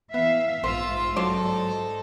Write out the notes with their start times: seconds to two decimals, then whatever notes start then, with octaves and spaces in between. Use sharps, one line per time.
0.14 E3 B3 E5 F5
0.64 A#1 G#2 F4 C5 E6
1.16 F#3 D#4 A4 C5 D5